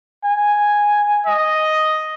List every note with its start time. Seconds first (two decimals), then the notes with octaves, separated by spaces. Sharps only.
0.24 G#5
1.27 D#5